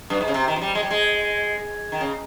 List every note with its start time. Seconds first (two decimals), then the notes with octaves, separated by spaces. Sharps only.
0.10 G2
0.21 G#2
0.28 C#3
0.34 C3
0.48 D#3
0.56 F3
0.62 G3
0.75 G#3
0.83 G3
0.91 G#3
1.92 D#3
2.01 C#3